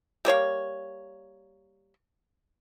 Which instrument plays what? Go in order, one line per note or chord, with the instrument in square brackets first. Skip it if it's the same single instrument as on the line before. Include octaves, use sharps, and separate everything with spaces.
[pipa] G3 A#3 C#5 F5